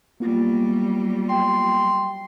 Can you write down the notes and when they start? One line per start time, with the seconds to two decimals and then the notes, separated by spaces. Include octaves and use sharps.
0.20 F#3 G3 A#3 B3 F4
1.29 G5 C6